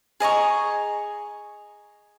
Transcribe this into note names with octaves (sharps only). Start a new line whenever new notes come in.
G#4 D#5 A#5 C#6